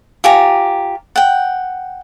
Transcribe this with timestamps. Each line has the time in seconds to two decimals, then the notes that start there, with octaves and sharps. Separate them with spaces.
0.24 F4 G4 G#5 A#5
1.16 F#5 G5